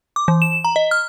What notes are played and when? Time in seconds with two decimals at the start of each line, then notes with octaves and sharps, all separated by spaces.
0.16 D6
0.28 E3
0.42 E7
0.64 A#5
0.76 D#5
0.91 F6